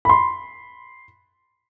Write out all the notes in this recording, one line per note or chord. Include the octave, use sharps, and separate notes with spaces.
B5 C6